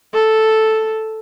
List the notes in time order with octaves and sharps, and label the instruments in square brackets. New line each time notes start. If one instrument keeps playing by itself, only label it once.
[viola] A4